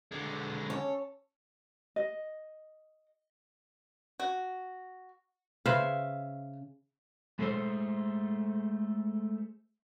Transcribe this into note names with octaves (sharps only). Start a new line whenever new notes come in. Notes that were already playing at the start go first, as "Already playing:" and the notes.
D3 G#3
C#4 A4 C#5
D#5
F#4
C#3 B4 C5 E5 F5
G#3 A3 G#4 A4 C5